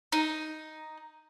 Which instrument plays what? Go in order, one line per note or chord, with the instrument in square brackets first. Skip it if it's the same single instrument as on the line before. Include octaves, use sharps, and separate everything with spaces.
[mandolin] D#4